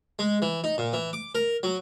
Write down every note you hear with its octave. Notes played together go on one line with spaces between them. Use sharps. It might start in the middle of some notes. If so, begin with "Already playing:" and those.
G#3
E3
D#4
A#2
E3
D6
A#4
F#3